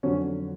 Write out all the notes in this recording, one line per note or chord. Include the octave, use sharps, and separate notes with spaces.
F2 D3 F#3 C#4